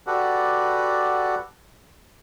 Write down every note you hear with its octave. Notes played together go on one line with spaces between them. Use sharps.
F#4 G4 A4 B4 D5 F#5